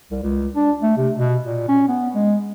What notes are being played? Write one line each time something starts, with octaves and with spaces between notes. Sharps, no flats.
C2
C#2
D4
A3
C3
B2
A#2
C#4
B3
G#3